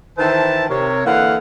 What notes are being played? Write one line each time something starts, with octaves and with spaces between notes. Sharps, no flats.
D#3 E3 C5 E5 A5
C3 A#4 C#5
D3 E3 A#3 F5 F#5